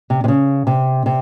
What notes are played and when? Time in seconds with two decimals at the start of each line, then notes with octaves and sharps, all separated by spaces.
0.10 C3
0.24 C3
0.28 C#3
0.67 C3
1.06 C3